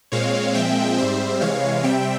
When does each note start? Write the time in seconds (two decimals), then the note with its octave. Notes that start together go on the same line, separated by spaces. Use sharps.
0.12 A#2 G#3 C4 C#5 F5
0.54 A#2 F3 G#3 C4 E5 G5
0.98 G#2 G3 C4 C5 E5
1.41 C3 E3 G#3 C#5 F5
1.84 C3 G3 C4 E5 G5